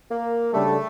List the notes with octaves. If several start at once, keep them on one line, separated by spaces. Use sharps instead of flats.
A#3
C#3 G3 A3 D4 A4